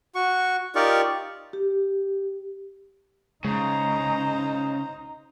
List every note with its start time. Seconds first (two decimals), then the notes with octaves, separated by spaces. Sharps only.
0.15 F#4 C#6
0.75 D#4 F4 G4 A#4 D5 C#6
1.53 G4
3.45 C#3 G#3 D#4 C5 A#5